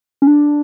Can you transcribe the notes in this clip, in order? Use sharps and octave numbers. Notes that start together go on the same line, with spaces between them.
C#4
D4